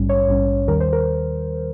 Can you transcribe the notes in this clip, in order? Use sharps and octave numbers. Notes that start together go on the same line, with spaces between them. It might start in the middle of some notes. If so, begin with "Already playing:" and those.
Already playing: A#1 G#2 G3 C#4
C#5
A#1 G#2 G3 C#4
D#2 D#3 G3 A#4
C5
A#4